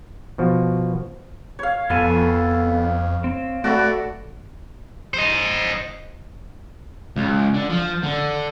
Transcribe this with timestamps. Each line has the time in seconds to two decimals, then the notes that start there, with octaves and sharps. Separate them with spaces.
0.38 B2 F3 F#4
1.59 C#5 F5
1.90 F2 B3 A4 F5 G#5
3.24 C4
3.64 A3 F#4 A4 D5 B5
5.14 C5 D#5
7.16 C#2
7.54 D3
7.69 F3
8.03 D3